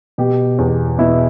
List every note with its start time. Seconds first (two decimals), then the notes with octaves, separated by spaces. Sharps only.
0.18 B2 G4
0.58 E2
0.99 B2 E4